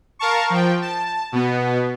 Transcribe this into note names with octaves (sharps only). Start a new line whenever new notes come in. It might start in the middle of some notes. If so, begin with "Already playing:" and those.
A#4 F5 A5 C#6
F3 G5
A5
B2 B3